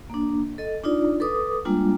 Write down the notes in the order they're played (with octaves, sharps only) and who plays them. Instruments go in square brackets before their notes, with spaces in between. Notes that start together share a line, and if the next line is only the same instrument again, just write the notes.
[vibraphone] A#3 D4
A4 D#5
D4 D#4 F4 D5
A4 B4 D6 D#6
G3 G#3 A#3 D4 F4